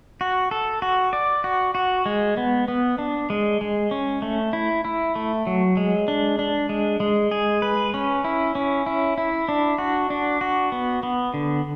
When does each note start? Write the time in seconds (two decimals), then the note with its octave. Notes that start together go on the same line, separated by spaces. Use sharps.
0.21 F#4
0.51 A4
0.82 F#4
1.13 D5
1.44 F#4
1.75 F#4
2.06 G#3
2.37 B3
2.68 B3
2.98 D4
3.30 G#3
3.61 G#3
3.91 C#4
4.22 A3
4.53 E4
4.85 E4
5.16 A3
5.47 F#3
5.77 G#3
6.08 D4
6.39 D4
6.69 G#3
7.00 G#3
7.31 G#4
7.62 B4
7.94 C#4
8.24 E4
8.55 C#4
8.86 E4
9.18 E4
9.49 D4
9.78 F#4
10.10 D4
10.41 F#4
10.72 B3
11.03 B3
11.34 D3